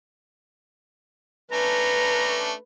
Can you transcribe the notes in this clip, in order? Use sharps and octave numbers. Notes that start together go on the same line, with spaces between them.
A3 C#4 D4 B4 A#5